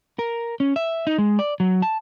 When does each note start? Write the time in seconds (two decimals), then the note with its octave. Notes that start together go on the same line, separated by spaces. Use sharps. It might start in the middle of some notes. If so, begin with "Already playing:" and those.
0.19 A#4
0.60 C#4
0.76 E5
1.07 D#4
1.18 G#3
1.39 D5
1.60 F#3
1.82 A5